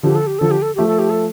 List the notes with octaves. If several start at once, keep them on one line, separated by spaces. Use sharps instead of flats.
D3 F3 G4
A4
G4
D3 F3 A4
G4
A4
F3 A3 G4
A4
G4
A4